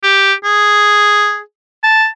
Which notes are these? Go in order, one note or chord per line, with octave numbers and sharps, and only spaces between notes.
G4
G#4
A5